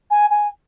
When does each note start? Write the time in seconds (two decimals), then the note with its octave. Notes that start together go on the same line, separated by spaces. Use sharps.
0.11 G#5
0.30 G#5